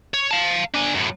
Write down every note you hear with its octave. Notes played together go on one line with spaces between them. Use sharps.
C#5
F5 A5
D4 G#5
F#2 A2